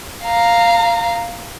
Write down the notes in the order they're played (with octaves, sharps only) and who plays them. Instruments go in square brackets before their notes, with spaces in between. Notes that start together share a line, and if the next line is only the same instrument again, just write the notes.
[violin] F5 A#5